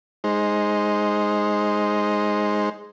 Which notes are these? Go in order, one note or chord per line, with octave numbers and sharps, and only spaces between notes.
G#3 D#4 C5